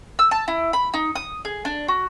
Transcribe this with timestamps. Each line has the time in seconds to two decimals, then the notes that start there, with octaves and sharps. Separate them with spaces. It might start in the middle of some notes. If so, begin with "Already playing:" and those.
0.19 E6
0.31 A5
0.48 E4
0.73 B5
0.94 D#4
1.16 D#6
1.45 G#4
1.65 D4
1.88 F#4